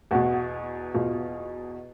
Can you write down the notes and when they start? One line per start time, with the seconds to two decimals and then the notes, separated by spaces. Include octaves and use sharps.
0.11 E2 B2 F#4
0.94 E2 B2 F4